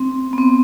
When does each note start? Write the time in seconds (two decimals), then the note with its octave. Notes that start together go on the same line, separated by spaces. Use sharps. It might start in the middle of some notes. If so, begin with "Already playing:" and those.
Already playing: C4
0.33 B3
0.38 C4